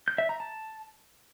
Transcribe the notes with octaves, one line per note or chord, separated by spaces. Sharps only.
G6
E5
A#5
A5